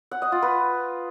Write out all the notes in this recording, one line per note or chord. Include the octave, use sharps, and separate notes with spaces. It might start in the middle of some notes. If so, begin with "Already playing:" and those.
F#5
D#5
F4
B4